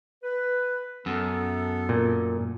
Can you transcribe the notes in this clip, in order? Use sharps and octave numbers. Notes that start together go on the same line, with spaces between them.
B4
F#2 B3 A4
A#2